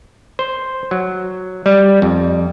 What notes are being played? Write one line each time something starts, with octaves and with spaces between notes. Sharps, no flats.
C5
F#3
G3
F2